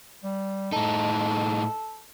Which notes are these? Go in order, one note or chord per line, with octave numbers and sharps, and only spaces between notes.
G3
A2 D#4 A4